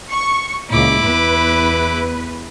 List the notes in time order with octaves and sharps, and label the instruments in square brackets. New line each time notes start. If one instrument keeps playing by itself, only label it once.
[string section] C#6
[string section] C#2 A#2 [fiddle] E4 D6
[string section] E2 B4